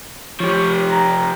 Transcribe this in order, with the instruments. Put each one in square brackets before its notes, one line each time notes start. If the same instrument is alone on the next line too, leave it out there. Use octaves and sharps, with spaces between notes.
[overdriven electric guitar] F3 G4 [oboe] C#5
[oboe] A#5